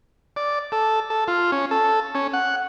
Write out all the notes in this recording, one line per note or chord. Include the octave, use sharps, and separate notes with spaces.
D5
A4
A4
F4
C#4
A4
C#4
F#5